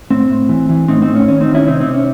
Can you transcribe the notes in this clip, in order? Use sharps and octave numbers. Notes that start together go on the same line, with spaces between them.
A2 C4
A2
E3
E3
A2 C4 D#4
C4 D#4
A2
C#4
D#3 C#4
C4 D#4
D#3
C#4 E4
C3 C4 D#4
C4 D#4
C3
C#4